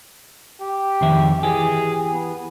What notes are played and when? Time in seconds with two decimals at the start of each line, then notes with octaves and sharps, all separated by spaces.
0.61 G4
1.01 F2 D#3 E5
1.43 E3 G4 G#4
2.12 B3